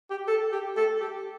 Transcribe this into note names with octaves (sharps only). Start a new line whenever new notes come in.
G4
A4
G4
A4
G4